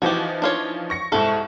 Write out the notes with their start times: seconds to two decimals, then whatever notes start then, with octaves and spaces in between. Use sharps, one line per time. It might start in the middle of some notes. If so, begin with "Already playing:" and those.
0.02 E3 F3 D#4 F#4 G4
0.42 D4 F4 C#5
0.90 C#6 A#6 C#7
1.12 C2 G#2 E4 A4 C#6